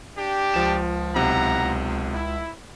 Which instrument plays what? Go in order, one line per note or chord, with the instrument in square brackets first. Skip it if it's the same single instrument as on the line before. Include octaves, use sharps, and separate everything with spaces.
[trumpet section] D4 G4
[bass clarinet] C#2 [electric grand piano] F3 E7
[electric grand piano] B1 C3 [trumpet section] E4 F#5 A#5
[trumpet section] E4